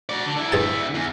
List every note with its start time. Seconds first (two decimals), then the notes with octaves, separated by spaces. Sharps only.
0.09 F#4 D5
0.25 D3
0.37 D3 E4
0.52 G2 G#4 A5
0.95 E2